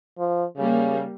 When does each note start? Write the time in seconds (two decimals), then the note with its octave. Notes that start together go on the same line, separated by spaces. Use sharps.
0.18 F3
0.57 C#3 G3 A#3